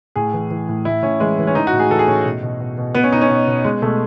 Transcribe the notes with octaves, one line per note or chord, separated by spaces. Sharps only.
A2 G#4
E3
E3
A2
A2 E4
A2 C#4
E3 G#3
E3
C#4
E3 D#4
F#4
A2
G#4
E3 A4
G#4
A2 C#4
B2
B2
B2
B2
B2 B3
C#4
B2 D#4
C#4
B2
B2
B2 G#3
B2 A3